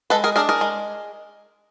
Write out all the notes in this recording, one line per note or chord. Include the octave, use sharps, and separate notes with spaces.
G#3 A4 B4
G#4 A#4
D4 G#4 A#4
G#4 A#4
G#3